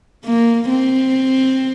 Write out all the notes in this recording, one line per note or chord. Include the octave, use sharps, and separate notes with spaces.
A#3
C4